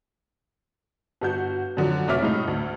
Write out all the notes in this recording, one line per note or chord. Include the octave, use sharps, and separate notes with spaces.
G1 F#4 G6
F#2 D3 F3 F#3
F1 B2 C#4 E5 D6 F6
A2 G#3 D#4
D2